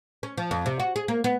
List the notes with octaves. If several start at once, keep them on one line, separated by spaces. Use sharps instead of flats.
C#4
F3
F2
C3
F#4
G#4
A#3
B3